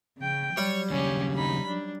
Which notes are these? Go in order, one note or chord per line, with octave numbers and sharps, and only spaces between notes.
C#3 G5
F#3 G3 C#5
D#2 C#3 C#4 G4
D#4 B5
D4